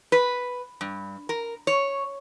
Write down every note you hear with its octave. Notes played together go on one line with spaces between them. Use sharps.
B4
G2
A#4
C#5